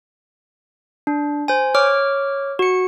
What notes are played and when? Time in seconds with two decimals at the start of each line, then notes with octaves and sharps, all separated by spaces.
1.07 D4
1.48 C5 G#5
1.75 C#5 D6 F6
2.59 F#4 C#7